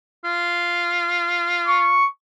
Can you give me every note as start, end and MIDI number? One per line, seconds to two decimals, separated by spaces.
0.24 2.03 65
1.67 2.06 85